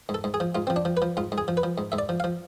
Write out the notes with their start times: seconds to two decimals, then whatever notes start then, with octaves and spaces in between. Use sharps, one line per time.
0.09 G#2
0.14 A4
0.24 G#2
0.34 G#4
0.40 F3
0.55 G#2 F4
0.67 F3 C4
0.76 D4
0.85 F3
0.97 B4
1.02 F3
1.17 G#2 F4
1.32 G#2
1.38 G#4
1.48 F3
1.57 B4
1.63 F3
1.78 G#2
1.92 G#2 E5
1.99 D5
2.09 F3
2.20 F5
2.24 F3